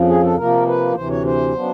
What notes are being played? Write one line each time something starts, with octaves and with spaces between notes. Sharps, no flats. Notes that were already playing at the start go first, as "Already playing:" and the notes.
Already playing: F2 C#3 F3
G#4
A4
C3 F3 A#3 A#4
B4
D2 C3 E3 C5
C#5
C5
C#3 F#3 B3 D4